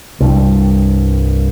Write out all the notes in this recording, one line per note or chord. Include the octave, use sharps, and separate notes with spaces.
C2 G2